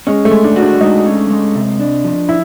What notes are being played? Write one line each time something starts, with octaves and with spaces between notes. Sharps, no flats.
G#3 C#4
A3
G#3
D4
F#4
D4
G#3 D#4
C#4
G#3
C3
D4
F3
E4